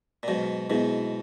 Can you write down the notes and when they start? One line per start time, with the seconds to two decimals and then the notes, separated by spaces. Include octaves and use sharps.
0.23 A#2
0.28 G#2 B2 F#3
0.70 G#2 B2 B3 E4 G#4